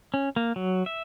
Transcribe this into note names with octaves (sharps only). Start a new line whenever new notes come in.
C#4
A#3
F#3
E5